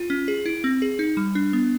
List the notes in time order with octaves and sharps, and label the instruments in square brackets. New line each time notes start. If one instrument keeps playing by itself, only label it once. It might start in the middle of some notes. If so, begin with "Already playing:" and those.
Already playing: [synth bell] F4
C#4
G#4
E4
C4
G#4
D#4
G3
D4
B3